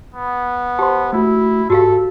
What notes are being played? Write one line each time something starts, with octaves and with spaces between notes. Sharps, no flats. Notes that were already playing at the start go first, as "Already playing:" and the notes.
B3
G4 C5 A5 C6
A3 E4 F#4
G#2 F#4 G4 A4 F5